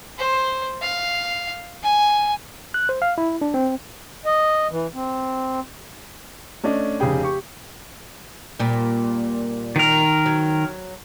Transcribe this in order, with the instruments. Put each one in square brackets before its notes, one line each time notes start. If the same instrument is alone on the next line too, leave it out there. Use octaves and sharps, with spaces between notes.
[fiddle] C5
F5
G#5
[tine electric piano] F#6
C5
F5
E4
D4
C4
[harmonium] D#5
E3
C4
[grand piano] A3 C#4 D4 D5 D#5
F1 C#3 G4 G#4 G5 B5
G4 C#6
[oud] A#2 G3
[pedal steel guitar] D#3 A#4
[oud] F#3